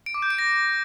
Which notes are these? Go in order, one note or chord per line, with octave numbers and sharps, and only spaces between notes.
D7
D6
G6
D7
A#6